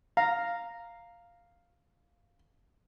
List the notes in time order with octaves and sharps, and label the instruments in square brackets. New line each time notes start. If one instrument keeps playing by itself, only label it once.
[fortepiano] F5 [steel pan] A#5